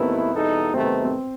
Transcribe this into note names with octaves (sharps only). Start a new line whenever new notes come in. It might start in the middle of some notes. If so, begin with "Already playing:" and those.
Already playing: D#2 D#3 A3 B3 C4 E4
E2 B2 G3 D#4 A4
C3 D#3 F#3 A3 C4
B3
C4